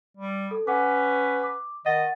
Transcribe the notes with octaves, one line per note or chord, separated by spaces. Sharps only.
G3
A4
C#4 B4 F#5 D6
D6
D#3 D#5 F#5 A6